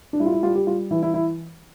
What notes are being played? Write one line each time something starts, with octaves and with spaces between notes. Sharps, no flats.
D4
G3 E4
F4
E4
G3 F4
G4
G3 F4
E3 E4
E4
E4